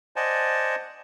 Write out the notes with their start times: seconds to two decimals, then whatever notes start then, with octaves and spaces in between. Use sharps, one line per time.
0.16 C5 D5 D#5 F#5 G#5 A5